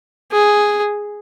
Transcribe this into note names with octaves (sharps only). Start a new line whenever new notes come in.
G#4